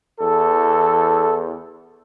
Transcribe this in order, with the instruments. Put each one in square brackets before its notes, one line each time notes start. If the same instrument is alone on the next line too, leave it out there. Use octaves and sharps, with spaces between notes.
[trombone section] E2 E3 A4